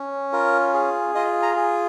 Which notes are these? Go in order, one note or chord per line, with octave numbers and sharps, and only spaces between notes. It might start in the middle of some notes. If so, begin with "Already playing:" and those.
Already playing: C#4
F4 A#4
G#4
F4 D#5
A#5
G#4